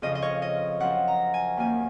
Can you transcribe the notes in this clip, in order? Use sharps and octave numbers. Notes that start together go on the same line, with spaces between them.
F2 C#3 F3 D#5
D#5
C#5
D#5
F#2 F3 C4 F#5
A#5
G#5
D#2 D#3 A#3 C#4 G#5